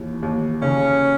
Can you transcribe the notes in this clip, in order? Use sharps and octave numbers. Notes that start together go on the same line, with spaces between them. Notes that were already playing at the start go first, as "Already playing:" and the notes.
Already playing: D#2 E3
D#2
C#3 C#4